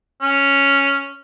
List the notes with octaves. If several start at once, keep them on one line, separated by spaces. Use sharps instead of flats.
C#4